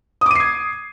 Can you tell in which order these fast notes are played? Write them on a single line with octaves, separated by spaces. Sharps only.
D#6 D6 D#7 C7 G#6